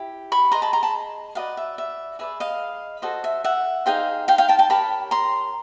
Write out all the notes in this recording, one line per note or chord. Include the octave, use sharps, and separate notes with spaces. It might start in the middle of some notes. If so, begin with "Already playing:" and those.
Already playing: E4 G4
B5 C#6
G#4 B4 D#5 A#5 C6
A5 B5
A#5 C6
A5 B5
F#4 B4 D5 D#5 F5
E5
E5
G#4 B4 D5 E5
D#5 F5
F#4 A4 C5 D#5
E5
E5 F#5
D#4 G#4 C5 F5 G5
F5 G5
F5 G5
G5 A5
G5 A5
G4 A#4 C#5 A5 B5
A#5 C6